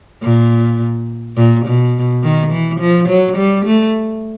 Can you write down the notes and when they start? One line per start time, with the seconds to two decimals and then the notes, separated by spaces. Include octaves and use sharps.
0.22 A#2
1.37 A#2
1.66 B2
2.23 D#3
2.51 E3
2.80 F3
3.09 F#3
3.37 G3
3.66 A3